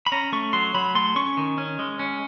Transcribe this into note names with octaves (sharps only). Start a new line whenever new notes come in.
B5
C#4 A#5
A3 C#6
F#3 C6
F#3 B5
A3 C6
C#4 C#6
D#3
C#4
G#3
C#4